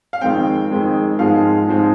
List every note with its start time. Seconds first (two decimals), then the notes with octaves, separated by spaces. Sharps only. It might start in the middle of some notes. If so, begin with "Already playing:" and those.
0.13 F5
0.21 F2 D#3 G#3 C4 G5
0.70 F2 D#3 G#3 C4
1.19 G#2 F3 G#3 C4 F5
1.68 G#2 F3 G#3 C4